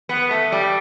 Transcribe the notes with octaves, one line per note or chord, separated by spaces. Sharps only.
B3
A3
G3